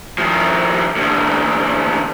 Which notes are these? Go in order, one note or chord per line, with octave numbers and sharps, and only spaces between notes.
D#3 F3
E2 D3